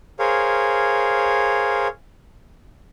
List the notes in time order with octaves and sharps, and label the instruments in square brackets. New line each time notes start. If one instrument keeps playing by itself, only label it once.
[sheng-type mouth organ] G#4 A#4 C5 C#5 F5